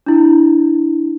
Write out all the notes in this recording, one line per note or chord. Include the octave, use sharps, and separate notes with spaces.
D4 E4